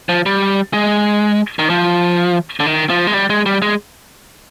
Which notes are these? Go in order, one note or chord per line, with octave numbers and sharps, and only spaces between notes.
F3
G3
G#3
D#3
F3
D3
D#3
F3
G#3
G3
G#3
G3
G#3